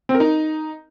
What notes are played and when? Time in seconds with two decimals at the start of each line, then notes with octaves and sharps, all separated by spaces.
0.09 C4
0.15 A#4
0.20 D#4